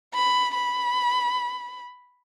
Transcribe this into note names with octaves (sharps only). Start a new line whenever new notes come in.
B5
B5